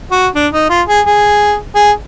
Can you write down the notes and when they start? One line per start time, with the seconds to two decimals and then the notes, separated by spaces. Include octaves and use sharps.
0.11 F#4
0.35 D4
0.53 D#4
0.69 F4
0.88 G#4
1.06 G#4
1.75 G#4